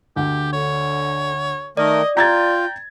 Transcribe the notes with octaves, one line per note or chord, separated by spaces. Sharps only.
D2 G4
D3 C#5
D#3 A3 A#4 D5 D#5
F4 G5 A#5 G#6 A6